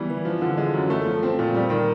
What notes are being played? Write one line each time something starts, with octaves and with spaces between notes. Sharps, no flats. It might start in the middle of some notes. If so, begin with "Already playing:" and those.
Already playing: E3 G3 B3
E3
F3
D3
G#3
F#2
A3
F3
C4
A#2
G3
D#3